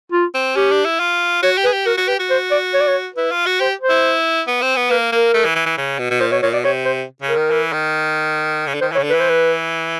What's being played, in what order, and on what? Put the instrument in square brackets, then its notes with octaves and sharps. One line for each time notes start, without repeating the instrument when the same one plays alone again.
[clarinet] F4
[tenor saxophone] C4
[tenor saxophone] C#4 [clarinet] G4
[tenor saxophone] D4
E4
F4
[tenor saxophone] F#4 [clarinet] C#5
[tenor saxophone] G4
[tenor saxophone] G#4 [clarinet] B4
[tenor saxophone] G4
[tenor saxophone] F#4 [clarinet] A#4
[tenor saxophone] F#4
[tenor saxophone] G4 [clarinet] B4
[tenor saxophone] F#4
[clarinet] C5
D5
C#5
D5
C#5
[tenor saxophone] E4 [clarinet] B4
[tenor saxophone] F4
F#4
[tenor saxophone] G4 [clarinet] C5
[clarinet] C5
[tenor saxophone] E4
B3
C4
B3
[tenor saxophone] A#3 [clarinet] B4
[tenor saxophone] A#3 [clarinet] A#4
[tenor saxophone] A3
E3
E3
E3
C#3
B2
B2
[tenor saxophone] A#2 [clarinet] C5
[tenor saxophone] B2 [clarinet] C#5
[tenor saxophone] A#2 [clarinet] C#5
[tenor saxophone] B2 [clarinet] D5
[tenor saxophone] C3 [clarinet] C#5
[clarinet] C5
[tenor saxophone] C#3
[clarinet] A#4
[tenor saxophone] D#3
E3
D#3
C#3
D3
[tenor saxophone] D#3 [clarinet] C5
[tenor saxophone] E3 [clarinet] C#5
[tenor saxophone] C#3
D3
[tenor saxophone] E3 [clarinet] B4
[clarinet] C5
B4